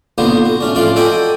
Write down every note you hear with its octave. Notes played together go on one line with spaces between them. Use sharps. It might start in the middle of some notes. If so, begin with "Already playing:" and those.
B1 A#2 D3 B3 F#4 C5
F#4
A3 C#4 D4
F2 A2 C#4 F4 D5 C6
F#4 A4 D5 D#5 G5 G#5